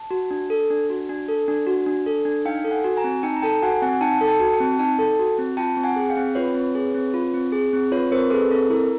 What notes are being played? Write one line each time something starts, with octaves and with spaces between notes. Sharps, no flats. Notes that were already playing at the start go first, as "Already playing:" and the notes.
Already playing: A5
F#4
D4
A4
D4
F#4
D4
A4
D4
F#4
D4
A4
D4
D#4 F5 G5
A4
F#5 G#5
F#4
G#5 A#5
C4
D#4 G5 A5
A#5
A4 G5 A5
F#4 F#5 G#5
C4 F#5 G#5
D#4 G5 A5
A4
G5 A5
F#4
G5 A5
C4
D#4 G5 A5
A4
F#4
C4
F4 G5 A5
C4
F#5 G#5
G#4
F5 G5
C4
F4 B4 C#5
C4
G#4
C4
F4
C4
G#4
C4
F4 B4 C#5
C4 A#4 C5
G#4 A4 B4
C4 A4
E4 A#4